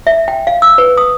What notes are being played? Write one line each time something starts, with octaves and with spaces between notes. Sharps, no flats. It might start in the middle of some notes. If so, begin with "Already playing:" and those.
E5
G5
F5
E6
B4
D#6